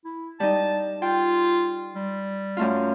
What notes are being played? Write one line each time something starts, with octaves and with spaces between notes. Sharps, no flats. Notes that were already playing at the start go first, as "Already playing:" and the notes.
E4
G3 D#4 A5
F4 G5
G3
F#2 A3 F4